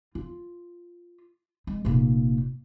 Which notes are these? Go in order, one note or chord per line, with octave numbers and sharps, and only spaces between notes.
F4
G#3
F1 A#2